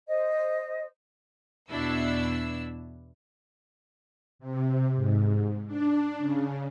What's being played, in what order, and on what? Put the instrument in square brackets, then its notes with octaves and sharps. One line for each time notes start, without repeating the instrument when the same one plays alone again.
[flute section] C5 D#5
[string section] E2 B2 D4 E4 E6
[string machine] C3
G#2
D4
C#3